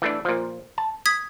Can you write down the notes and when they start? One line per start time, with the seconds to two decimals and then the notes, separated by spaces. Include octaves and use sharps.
0.02 E3 A3 D4
0.25 A#2 F3
0.78 A5
1.06 D#6 G#6 B6